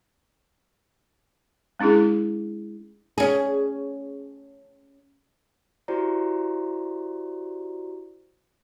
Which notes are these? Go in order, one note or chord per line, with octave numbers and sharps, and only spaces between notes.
G#3 C#4 D4 E4 G#4
C#4 G#4
E4 F#4 G4 C5 D5 A#5